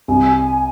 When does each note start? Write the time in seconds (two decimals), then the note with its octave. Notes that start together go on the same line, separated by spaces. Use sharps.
0.08 C2 G#5